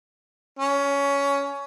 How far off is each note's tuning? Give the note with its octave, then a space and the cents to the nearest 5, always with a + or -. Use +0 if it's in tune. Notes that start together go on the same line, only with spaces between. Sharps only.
C#4 +15